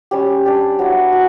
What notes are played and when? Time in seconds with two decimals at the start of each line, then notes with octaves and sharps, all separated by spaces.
0.11 G3 C#4 G4
0.45 D4 G4 D5
0.79 F#3 B3 E4
1.12 F#4